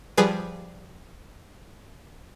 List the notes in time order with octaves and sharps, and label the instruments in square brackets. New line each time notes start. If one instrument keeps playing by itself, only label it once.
[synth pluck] F3 G3 G#4 B4